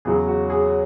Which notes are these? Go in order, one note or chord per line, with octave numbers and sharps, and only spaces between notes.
E2 C#3 F#3 G#4
F#4
G#4